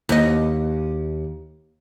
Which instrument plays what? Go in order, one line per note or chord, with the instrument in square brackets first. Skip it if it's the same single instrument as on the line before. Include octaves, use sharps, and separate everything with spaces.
[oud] D#2 D#5